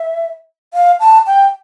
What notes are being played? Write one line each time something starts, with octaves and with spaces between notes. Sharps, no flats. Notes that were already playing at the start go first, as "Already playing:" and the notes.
Already playing: E5
F5
A5
G5